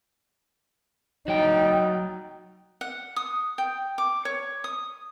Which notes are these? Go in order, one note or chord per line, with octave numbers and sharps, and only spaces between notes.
F#3 D#4 G5
F#5
D#6
G5
D6
C#5
D#6